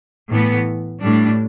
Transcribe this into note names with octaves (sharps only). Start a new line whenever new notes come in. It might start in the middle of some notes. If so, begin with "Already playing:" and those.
A2 E3 B3
A2 G3 D4